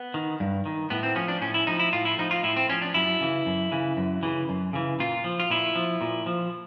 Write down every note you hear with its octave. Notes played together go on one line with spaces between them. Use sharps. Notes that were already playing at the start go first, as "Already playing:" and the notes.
Already playing: B3
D#3
G2
D#3
A2 B3
C4
F3 C#4
D4
A2 C#4
E4
F3 D#4
E4
A2 F4
E4
F3 D#4
F4
A2 E4
C4
F3 C#4
D4
F#2 E4
C#3 E3
F#2
C#3 E3
F#2
C#3 E3
F#2
C#3 E3
A#2 F4
F3
F4
A#2 E4
F3
A#2
F3